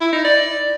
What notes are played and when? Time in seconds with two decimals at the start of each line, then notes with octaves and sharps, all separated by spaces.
0.01 E4
0.12 D#4
0.24 D5